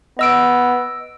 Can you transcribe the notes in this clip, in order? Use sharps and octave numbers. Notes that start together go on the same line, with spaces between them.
B3 D#5 E6 D7